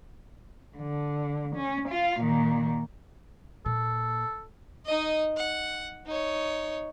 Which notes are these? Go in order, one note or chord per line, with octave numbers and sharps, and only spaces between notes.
D3
C#4
F4 F5
A#2 D#3
A#2 A#3 A4
D#4 D#5
F#5
D#4 C#5